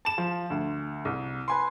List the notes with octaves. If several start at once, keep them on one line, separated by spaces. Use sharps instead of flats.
A5 E7
F3
D2
C2
B4 G#5 C6